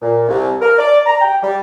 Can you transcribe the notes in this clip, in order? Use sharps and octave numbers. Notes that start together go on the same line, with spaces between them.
A#2
C2
A#4
D5
A#5
G5
G3